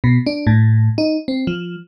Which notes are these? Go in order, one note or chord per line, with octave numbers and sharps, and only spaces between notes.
B2
D4
A2
D#4
C4
F3